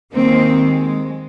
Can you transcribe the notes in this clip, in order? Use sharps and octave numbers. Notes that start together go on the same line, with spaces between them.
D#2 D#3 G#3 A#3 C4
G#3